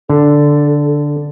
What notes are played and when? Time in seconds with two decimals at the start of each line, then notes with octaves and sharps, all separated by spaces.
0.10 D3 A4